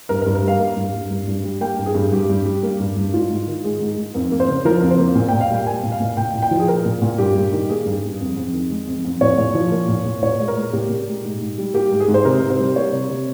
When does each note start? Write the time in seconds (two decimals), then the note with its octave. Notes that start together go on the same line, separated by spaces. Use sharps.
0.09 G2 A#4
0.22 A#4
0.26 G2
0.35 A#4
0.43 G3 F5
0.60 A#3
0.77 G2
0.93 G2
1.10 G2
1.28 G2
1.44 G3
1.61 A#3 G5
1.78 G2
1.86 G#4
1.95 G2
2.12 G2 G4
2.30 G2
2.46 G3
2.63 A#3
2.79 G2
2.96 G2
3.14 G#2 F4
3.30 G#2
3.47 D#3
3.64 G#3 G#4
3.80 G#2
3.98 G#2
4.14 F2 A#4
4.32 A#3
4.40 C5
4.48 C#3
4.65 F3 A#4
4.82 F2
4.91 C5
4.99 A#3
5.15 A#2
5.29 A#2 G5
5.41 F5
5.50 G3 G5
5.66 A#3 G#5
5.83 A#2
5.92 F5
6.00 A#2
6.17 A#2 G5
6.34 A#2
6.42 G5
6.51 F3
6.60 G#4
6.68 A#3 A#4
6.85 A#2
7.02 A#2
7.18 G2 G4
7.35 G2
7.52 D#3
7.70 A#3 G#4
7.86 G2
8.03 G2
8.20 F2
8.36 F2
8.53 D#3
8.71 G#3
8.87 F2
9.05 F2
9.21 A#2 C#5
9.38 A#2
9.55 F3
9.72 A#3
9.88 A#2
10.05 A#2
10.22 A#2 C#5
10.40 G#3
10.48 A#4
10.56 G#3
10.73 A#2 G4
10.90 A#2
11.07 G#3
11.24 G#2
11.41 G#2
11.58 G3
11.74 A#3 G4
11.91 G#2
12.00 G#4
12.08 G#2
12.14 C5
12.25 C3 A#4
12.42 C3
12.50 C5
12.60 G3
12.76 A#3 C#5
12.93 C3
13.10 C3